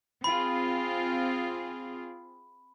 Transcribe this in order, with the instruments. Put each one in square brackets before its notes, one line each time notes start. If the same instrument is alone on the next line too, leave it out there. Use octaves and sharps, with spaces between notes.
[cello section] C4 F4 G#4 [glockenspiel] B5